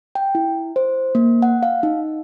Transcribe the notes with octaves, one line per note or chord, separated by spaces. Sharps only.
G5
E4
C5
A#3
F#5
F5
D#4